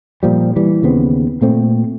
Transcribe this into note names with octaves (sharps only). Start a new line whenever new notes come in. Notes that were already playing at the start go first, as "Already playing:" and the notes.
A#2 F3 G3
E3 G3
D#2 C#3 B3 C4
A#2 A3 C4